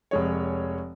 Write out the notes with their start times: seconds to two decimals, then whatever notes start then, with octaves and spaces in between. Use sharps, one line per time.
0.11 F1 G#3 C#5